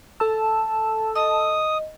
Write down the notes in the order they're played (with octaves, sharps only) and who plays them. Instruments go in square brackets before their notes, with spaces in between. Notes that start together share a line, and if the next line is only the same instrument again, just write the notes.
[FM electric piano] A4 E6 [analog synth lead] A5
[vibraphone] D#5 [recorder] D#6